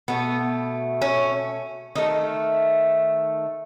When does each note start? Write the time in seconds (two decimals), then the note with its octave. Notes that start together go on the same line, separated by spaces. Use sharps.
0.08 B2 A3 B3
1.02 C#4
1.95 D#3 A3 D#4